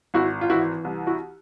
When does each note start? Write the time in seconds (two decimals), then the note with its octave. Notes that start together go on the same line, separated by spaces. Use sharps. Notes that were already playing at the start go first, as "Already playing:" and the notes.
0.14 G#1 E4 F#4
0.41 F4
0.49 E3 E4 F#4
0.84 C2
1.07 E4 F#4